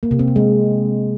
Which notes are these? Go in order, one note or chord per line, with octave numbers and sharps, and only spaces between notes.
A#3
C3
C4
C3
G#3